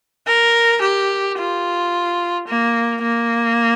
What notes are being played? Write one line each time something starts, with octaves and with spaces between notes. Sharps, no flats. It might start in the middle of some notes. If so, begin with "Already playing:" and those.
A#4
G4
F4
A#3
A#3